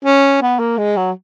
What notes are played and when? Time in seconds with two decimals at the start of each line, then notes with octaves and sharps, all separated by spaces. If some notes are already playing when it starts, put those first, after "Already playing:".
0.05 C#4
0.42 B3
0.59 A#3
0.78 G#3
0.97 F#3